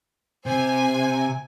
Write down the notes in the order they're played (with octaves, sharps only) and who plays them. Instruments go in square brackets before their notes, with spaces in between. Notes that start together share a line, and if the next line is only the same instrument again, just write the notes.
[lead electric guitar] C3 [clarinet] C5 [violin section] G#5